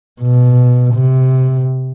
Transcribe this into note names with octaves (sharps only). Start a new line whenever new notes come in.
B2
C3